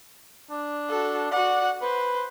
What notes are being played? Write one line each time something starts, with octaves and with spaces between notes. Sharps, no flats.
D4
F#4 A4
F#4 D5 F#5
B4 C5